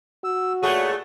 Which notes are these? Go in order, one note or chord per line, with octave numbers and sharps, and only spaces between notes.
F#4 E6
A#2 A3 G#4 C#5 F#5